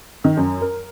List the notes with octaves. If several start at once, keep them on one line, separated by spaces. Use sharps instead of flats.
D#3
F#2
A#4